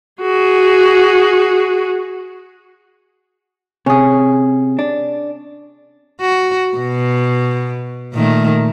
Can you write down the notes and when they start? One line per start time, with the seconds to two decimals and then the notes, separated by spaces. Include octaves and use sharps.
0.21 F#4 G#4
3.86 C3 C#4 G#4
4.79 D4
6.21 F#4
6.77 B2
8.14 A#2 D#3 A3